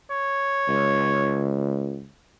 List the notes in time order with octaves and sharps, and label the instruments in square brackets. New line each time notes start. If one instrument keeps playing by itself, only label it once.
[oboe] C#5
[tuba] C#2